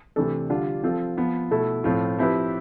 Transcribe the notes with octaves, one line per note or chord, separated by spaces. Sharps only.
C3 E3 A3 D4 A4
D3 G3 D4 F4
F3 C4 F4 A4
F3 B3 F4
B2 A3 E4 A4
A2 F3 C4 F4
F3 C4 E4 G4 B4